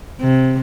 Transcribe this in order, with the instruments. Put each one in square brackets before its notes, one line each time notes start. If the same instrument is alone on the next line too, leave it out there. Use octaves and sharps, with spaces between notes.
[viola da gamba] C3